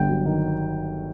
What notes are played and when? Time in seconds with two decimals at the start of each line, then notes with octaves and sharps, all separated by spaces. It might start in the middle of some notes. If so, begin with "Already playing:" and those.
Already playing: G1 G2 G5
0.09 F#3
0.26 D#3